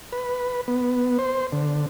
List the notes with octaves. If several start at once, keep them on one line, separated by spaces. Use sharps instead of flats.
B4
B3
C5
D3